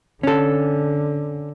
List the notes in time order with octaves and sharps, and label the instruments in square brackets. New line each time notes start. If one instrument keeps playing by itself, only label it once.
[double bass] D3 [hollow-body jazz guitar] C#4 A4